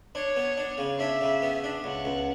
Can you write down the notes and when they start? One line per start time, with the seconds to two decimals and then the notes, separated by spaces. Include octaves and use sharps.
0.15 D4 C#5
0.36 B3
0.57 D4
0.78 C#3
1.00 D4 E5
1.21 C#3
1.42 B3
1.64 D4
1.84 C#2 F#5
2.05 C#2